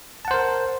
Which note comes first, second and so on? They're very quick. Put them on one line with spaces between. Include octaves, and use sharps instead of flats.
A5 F#5 C5 A#4